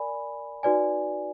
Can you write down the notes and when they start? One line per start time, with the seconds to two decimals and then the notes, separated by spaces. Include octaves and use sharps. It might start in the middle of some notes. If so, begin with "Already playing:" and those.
Already playing: A#4 D5 G#5 B5
0.63 D#4 F#4 B4 D5 G#5